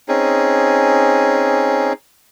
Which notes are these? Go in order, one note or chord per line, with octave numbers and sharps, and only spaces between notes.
C4 C#4 D#4 G#4